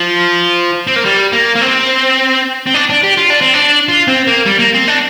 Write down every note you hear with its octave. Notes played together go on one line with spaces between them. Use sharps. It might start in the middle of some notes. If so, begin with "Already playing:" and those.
Already playing: F3
C4
A#3
G3
A#3
A#3
C4
C4
D4
D4
G4
F4
D4
C4
D4
F4
C4
A#3
G3
A#3
C4
D4